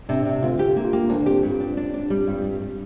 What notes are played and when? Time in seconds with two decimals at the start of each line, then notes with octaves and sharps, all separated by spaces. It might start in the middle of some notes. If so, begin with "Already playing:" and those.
0.09 C3 D4
0.26 C3
0.42 D2 F4
0.59 G4
0.76 A#3
0.85 F4
0.93 A#3 G4
1.09 D2 D4
1.26 C4 G4
1.43 G2
1.60 D4
1.77 D4
1.94 D4
2.10 G3
2.27 G2
2.44 G3
2.61 G3